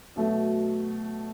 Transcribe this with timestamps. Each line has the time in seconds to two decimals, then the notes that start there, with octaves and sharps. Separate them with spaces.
0.16 B2 F#3 A3